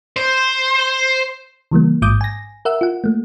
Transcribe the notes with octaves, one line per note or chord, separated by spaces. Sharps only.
C5
C#3 E3 G3 A#3
A1 G#2 D6 D#6 G6
G#5 A#6
A#4 E5 F#5 E6
F4 F#5
A3 A#3